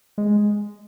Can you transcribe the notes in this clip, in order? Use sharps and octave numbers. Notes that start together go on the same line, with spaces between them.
G#3